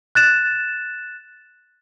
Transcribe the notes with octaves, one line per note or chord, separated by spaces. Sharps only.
F#6 A6 E7